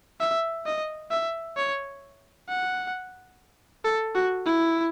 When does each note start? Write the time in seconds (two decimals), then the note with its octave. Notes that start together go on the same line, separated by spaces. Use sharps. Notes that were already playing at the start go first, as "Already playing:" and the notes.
0.20 E5
0.66 D#5
1.11 E5
1.57 C#5
2.49 F#5
3.85 A4
4.15 F#4
4.46 E4